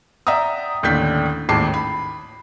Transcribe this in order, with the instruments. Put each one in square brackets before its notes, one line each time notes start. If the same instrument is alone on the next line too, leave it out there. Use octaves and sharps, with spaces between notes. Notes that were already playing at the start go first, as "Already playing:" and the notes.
[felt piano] D5 E5 F#5 G5 A#5 D#6
A1 D#2 D3 D4 G6 B6
A1 D#2 G#2 A5 D6 C7
B5